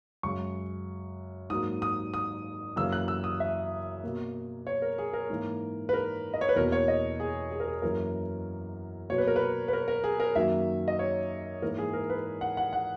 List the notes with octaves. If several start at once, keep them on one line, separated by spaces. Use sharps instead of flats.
F#2 C#3 G#3 C#6
G#2 F#3 A#3 D#6
D#6
D#6
F#2 C#3 E3 A#3 E6
F#6
E6
D#6
E5
B2 A#3
C#5
A#4
G#4
A#4
G#2 E3 A#3
B4
A#4
D#5
C#5
B4
E2 B2 A#3 A#4
C#5
D#5
G#4
G#4
A#4
G#4
F#2 E3 A#3 A#4
B2 F#3 A#3 C#5
B4
A#4
B4
B4
A#4
A#4
G#4
A#4
F#2 D#3 F#3 A#3 E5
D#5
C#5
G#2 E3 A#3 A#4
G#4
A#4
B4
F#5
F#5
F#5